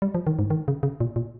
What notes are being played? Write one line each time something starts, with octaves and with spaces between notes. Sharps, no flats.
G3
F3
D#3
G#2
D#3
C#3
C#3
A#2
A#2